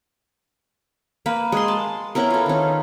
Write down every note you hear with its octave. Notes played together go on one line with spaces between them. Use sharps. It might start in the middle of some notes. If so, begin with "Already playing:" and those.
A#3 B4
G#3 G#5 C6
A5
B3 C#4 E4 A#4
F4 A4
D#3 C#4